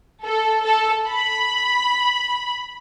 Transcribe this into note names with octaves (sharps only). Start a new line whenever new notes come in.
A4
A4
B5